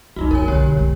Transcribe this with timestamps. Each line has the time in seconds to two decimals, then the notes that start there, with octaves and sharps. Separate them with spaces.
0.16 C2 F2 D#4 F4 F#4
0.31 F#1 C#3 A#4 C#5 G#5
0.48 C2 D3 G4 C#5
0.61 B1
0.77 G#3 C4